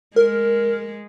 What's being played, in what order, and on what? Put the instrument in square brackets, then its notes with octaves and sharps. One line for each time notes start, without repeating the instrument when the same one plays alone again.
[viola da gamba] G#3 [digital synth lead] A#4